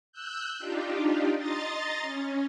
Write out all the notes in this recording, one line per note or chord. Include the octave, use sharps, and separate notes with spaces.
E6 F#6 G6
D4 D#4 F4 G4
D#5 A#5 C6 A6
C#4